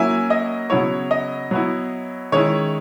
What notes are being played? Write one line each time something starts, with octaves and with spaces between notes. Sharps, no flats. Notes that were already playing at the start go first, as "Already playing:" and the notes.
Already playing: F#3 A#3 C#4 E4 E5 G#5
D#5
C#3 F#3 B3 E4 C#5
D#5
F#3 B3 E4
D#3 G#3 C#4 E4 C#5